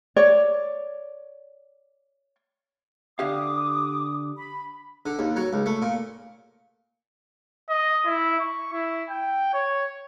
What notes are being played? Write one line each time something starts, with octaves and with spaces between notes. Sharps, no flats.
C#5 D5
D3 G4 F5 D6 D#6
B5
D3
D#2
F#3
C#2
A3
A#2
D#5
E4
C#6
E4
G5
C#5